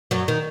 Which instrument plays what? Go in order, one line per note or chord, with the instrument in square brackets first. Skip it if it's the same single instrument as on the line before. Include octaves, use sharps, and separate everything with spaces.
[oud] F#2 F#3
D#3